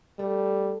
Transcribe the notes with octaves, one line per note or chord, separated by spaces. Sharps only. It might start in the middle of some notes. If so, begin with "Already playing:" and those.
G3 A3